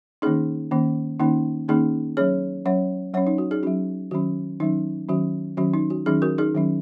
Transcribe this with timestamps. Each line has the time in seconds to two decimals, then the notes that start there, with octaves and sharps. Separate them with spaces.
0.22 D#3 A#3 C#4 D#4 G#4
0.71 D#3 A#3 C#4
1.20 D#3 A#3 C#4 D#4
1.68 D#3 A#3 C#4 D#4 G#4
2.17 F#3 C#4 G#4 C#5
2.65 F#3 C#4 C#5 F#5
3.14 F#3 C#4 C#5 F#5
3.27 D#4
3.38 F#4
3.51 D#4 G#4
3.63 F#3 C#4 F#4
4.11 D#3 F#3 C#4 F#4
4.60 D#3 F#3 C#4 D#4
5.09 D#3 F#3 C#4 F#4
5.57 D#3 F#3 C#4 F#4
5.74 D#4
5.90 F#4
6.06 D#3 F#3 C#4 D#4 G#4
6.22 F#4 A#4
6.38 D#4 G#4
6.55 D#3 F#3 C#4